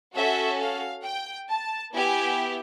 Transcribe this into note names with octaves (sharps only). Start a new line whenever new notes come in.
C#4 F#4 A4 E5
F5
G5
A5
B3 E4 G4 G#5